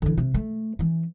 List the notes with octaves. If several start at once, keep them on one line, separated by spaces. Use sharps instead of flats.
D3 E3
C3
A3
E3 C#4